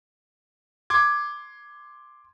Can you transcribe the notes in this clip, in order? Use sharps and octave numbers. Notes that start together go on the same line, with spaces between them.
C6 D6 G#6